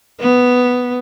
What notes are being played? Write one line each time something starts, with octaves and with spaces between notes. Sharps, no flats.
B3